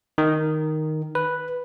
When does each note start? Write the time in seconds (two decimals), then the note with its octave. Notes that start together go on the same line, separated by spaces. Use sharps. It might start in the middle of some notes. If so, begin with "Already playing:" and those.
0.18 D#3
1.15 B4